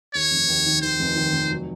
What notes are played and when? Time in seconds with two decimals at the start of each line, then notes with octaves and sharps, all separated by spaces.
0.14 D#2 C#5
0.31 F1
0.48 D#2
0.66 D#3
0.82 D#3 C5
1.00 F1
1.16 D#3
1.33 F1
1.51 F#3